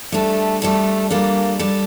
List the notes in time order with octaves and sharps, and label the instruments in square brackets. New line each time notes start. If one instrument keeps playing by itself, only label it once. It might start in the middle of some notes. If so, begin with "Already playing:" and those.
[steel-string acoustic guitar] G3 D4 A4 [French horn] A3
[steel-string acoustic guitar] G3 D4 A4 [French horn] A3
[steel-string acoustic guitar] G3 D4 A4 [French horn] A#3
[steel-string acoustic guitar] G3 D4 A4